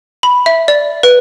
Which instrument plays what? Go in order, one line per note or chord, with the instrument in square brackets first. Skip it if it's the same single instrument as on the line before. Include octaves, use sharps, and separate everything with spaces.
[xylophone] B5
E5
D5
B4